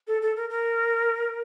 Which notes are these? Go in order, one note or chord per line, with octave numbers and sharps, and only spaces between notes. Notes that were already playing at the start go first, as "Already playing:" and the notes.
A4
A4
A#4
A#4